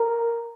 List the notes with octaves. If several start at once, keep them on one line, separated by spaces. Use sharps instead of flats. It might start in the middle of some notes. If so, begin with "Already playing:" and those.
Already playing: A#4